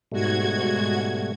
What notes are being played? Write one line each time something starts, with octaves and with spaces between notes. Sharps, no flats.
G#2 B2 G3 A3 F#4 G#6